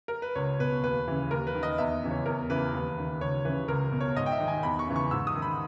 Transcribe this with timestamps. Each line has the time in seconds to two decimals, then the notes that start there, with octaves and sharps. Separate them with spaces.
0.08 A#4
0.22 B4
0.35 C#2 C#5
0.59 B2 B4
0.83 D#2 B4
1.08 C#3 E3
1.31 D#2 A#4
1.47 B4
1.55 D#3
1.63 D#5
1.78 E2 E5
2.02 C#3 E3
2.11 C#5
2.26 E2 A#4
2.49 C#3 E3 B4
2.73 D#2
2.98 D#3
3.21 C#2 C#5
3.45 C#3 E3 B4
3.68 C#2 A#4
3.92 B2
4.01 C#5
4.16 G#2 D#5
4.26 G5
4.32 E5
4.40 D#3
4.48 G#5
4.63 E2 B5
4.79 C#6
4.87 C#3 E3
4.96 C#6
5.11 G#2 E6
5.27 D#6
5.35 D#3
5.42 B5